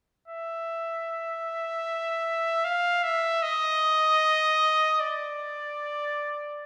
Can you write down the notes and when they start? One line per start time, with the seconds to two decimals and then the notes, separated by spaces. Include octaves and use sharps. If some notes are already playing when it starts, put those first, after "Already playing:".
0.28 E5
2.64 F5
3.03 E5
3.43 D#5
5.00 D5